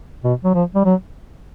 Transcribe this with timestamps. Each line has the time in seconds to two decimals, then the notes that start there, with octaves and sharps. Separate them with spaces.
0.24 B2
0.44 F#3
0.54 F3
0.75 G3
0.85 F#3